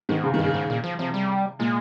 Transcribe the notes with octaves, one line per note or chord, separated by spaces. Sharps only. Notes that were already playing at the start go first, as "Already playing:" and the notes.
G#2 D#3
C#3
D#3
G2 C#3
G#2
A#2
F3
C3 F3
G3
A#2 G#3